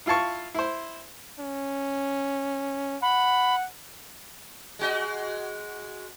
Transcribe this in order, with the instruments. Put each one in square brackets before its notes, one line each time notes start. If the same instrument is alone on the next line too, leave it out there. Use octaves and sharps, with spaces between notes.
[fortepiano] E4 F4 F5 A5 C#6
E4 C5
[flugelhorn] C#4
[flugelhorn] F#5 [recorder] B5
[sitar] G#3 F#4 D#5